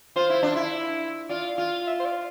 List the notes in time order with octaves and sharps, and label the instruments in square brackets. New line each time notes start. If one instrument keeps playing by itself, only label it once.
[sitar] F4 [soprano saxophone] C5
[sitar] E4
D4
E4
[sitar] F4 [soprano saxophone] D5
[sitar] F4
[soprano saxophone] E5
C5
D5